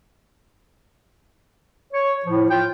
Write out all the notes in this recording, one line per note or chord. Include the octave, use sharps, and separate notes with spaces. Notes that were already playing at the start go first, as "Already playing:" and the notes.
C#5
A2 F3
F4 G5